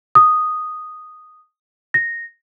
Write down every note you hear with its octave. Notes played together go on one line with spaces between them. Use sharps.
D#6
A#6